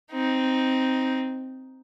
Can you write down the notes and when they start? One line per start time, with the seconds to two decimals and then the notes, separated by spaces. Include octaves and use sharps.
0.12 C4 D#4